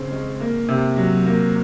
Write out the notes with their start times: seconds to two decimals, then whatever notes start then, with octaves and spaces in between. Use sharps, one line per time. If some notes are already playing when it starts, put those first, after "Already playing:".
Already playing: C#3 C4
0.11 G#3
0.40 A#3
0.68 C3
0.97 F#3
1.26 A#3